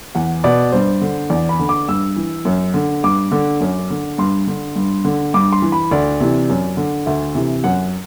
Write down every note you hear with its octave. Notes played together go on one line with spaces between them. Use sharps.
E2 F#5
B2 D5
G2 C5
D3
E2 D5
B5
D3
D6
G2 E6
E3
F#2
D3
G2 D6
D3
F#2
D3
G2 C6
D3
G2
D3
G2 D6
C6
E3
B5
D2 D5
C3 E3
F#2
D3
D2 E5
C3 E3
F#2 F#5